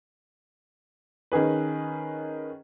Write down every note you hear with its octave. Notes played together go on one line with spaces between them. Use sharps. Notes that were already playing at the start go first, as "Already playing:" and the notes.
D#3 C#4 G#4 B4